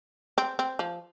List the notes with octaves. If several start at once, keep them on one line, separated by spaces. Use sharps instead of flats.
C4
C4
F3